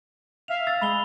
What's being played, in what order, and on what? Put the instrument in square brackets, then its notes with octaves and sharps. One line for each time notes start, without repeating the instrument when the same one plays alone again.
[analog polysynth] E5 F5 [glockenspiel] F7
[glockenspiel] E6 A6
[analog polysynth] G#3 [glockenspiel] B5 F7 G7